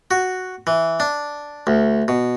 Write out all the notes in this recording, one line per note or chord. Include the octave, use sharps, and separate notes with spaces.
F#4
E3
D4
D2
B2